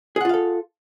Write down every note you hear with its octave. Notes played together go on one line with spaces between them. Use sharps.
F4 G#4 A4 F5 F#5